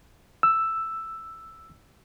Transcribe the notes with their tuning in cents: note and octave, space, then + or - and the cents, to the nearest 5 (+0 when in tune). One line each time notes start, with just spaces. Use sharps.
E6 +5